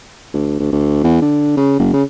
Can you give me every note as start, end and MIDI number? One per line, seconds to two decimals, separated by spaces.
0.34 0.56 38
0.60 0.68 38
0.72 1.03 38
1.04 1.21 40
1.22 1.54 50
1.57 1.75 49
1.79 1.92 30
1.93 2.03 49